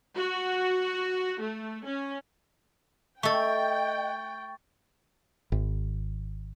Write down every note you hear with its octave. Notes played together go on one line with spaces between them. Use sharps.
F#4
A3
C#4
A3 A4 D#5 G5 C#6 A6
G#1